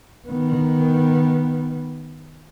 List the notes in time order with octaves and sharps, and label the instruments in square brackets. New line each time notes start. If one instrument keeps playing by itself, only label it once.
[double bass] D#3 B3